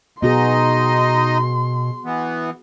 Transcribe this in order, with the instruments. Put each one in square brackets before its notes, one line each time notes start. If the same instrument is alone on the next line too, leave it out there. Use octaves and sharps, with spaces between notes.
[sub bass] B2 [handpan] B3 F#4 G#4 [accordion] D#4 D#5 [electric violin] C6
[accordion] E3 B3